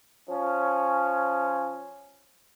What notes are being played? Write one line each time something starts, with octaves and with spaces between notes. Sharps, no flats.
F3 C#4